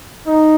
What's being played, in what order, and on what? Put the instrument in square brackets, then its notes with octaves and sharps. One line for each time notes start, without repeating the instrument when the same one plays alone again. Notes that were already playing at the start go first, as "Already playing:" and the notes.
[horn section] D#4